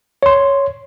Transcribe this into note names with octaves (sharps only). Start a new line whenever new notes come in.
C#5 C6